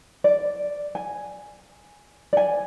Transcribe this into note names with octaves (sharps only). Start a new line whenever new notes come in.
D5
G#5
D5 G#5